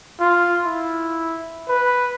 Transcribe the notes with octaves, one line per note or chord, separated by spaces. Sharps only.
F4
E4
B4